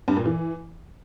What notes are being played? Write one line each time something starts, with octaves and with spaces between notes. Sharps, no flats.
G2
A#2
E3